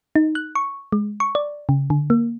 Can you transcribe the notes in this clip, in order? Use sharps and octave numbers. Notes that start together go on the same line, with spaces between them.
D#4
F#6
C#6
G#3
C#6
D5
C#3
D3
A#3